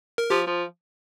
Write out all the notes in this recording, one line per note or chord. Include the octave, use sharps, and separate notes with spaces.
A#4
F3 G4
F3